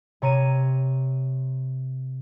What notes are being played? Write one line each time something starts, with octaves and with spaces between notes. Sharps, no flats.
C3 C#5 A#5 D#7